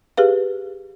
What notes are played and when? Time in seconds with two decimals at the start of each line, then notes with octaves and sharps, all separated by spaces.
0.17 G4 G#4 B4 F5